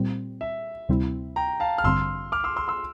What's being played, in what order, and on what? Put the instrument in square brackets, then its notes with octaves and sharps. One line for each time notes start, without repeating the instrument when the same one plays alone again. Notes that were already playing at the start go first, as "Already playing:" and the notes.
Already playing: [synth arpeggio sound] A#2 G3 C4
[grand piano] E5
[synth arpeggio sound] D2 C3 G3 C4 E4
[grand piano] G5 A#5
F5 A5
F6
[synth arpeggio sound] A1 G2 D3 G3 C4 [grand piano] C6 E6
[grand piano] D6 F6
C6 E6
C6 E6
C6 E6